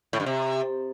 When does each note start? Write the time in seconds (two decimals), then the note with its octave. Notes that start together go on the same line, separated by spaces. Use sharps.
0.13 A2
0.20 G2
0.26 C3